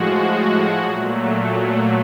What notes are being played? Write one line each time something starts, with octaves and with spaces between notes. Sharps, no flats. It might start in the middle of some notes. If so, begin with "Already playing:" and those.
Already playing: A2 F3 G#3 F#4
A#2 F#3 A3